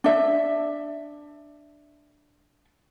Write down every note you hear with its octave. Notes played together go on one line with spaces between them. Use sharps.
D4 E5